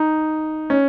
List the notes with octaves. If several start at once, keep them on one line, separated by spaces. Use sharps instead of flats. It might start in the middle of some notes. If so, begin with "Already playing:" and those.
Already playing: D#4
C#4